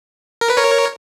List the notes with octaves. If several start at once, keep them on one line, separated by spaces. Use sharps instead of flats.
A#4
B4
A#4 C#5